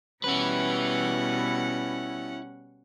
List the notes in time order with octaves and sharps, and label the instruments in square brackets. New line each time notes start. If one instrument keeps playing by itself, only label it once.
[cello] B2 G3 [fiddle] C#4 F#5 [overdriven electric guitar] E4 B4